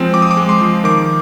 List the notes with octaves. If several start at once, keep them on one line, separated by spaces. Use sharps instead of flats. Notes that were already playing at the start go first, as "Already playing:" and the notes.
Already playing: F3 G#3 C4
F3 D6
D#6
D6
G#3
C6
F3
D#3 D6